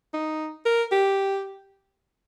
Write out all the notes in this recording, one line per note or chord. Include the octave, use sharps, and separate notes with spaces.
D#4
A#4
G4